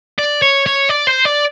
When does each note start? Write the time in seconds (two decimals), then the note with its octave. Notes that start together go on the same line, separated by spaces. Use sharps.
0.18 D5
0.42 C#5
0.66 C#5
0.89 D5
1.07 C5
1.25 D5